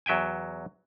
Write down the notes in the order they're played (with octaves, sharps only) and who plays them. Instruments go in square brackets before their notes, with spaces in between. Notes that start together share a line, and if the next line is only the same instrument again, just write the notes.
[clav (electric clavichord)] E2 F#3 E5 G5 G#5